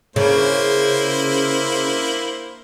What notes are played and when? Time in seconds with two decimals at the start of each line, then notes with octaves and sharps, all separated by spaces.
0.16 C#3 A#3 E4 C5